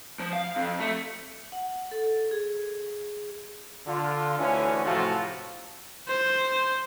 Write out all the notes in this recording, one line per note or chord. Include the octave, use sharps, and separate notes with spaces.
F3
F5
F2
A3
F#5
A4
G#4
D3 F4
D2 D3 E3 C#4
A2 C3 F3 F4 F#4 A4
C5